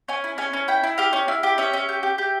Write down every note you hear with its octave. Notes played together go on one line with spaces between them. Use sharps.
C#4 G#5
E4
C#4 G#5
C#4
E4 G5
E4
G4 F5
C#4
E4
G4
C#4 E5
C#4
G4
G4
G4